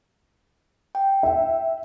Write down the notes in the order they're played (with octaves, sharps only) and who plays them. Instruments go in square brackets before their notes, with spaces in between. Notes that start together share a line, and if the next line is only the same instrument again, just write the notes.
[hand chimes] G5
[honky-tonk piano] E5